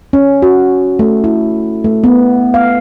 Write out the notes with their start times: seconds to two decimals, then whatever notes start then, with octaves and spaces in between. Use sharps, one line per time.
0.13 C#4
0.42 F#4
0.99 A3
1.24 E4
1.84 A3
2.04 B3
2.54 F5